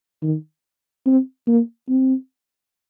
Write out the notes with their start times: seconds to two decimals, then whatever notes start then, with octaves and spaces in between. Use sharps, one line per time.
0.22 D#3
1.06 C4
1.47 A#3
1.89 C4